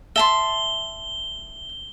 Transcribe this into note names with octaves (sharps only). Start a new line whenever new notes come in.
E5 A5 C6 G7